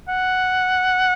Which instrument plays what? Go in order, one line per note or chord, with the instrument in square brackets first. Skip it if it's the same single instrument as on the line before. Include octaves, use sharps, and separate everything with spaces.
[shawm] F#5